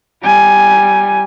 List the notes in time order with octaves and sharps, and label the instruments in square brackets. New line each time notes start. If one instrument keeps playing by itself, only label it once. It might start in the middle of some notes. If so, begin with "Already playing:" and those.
[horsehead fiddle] G3 G#5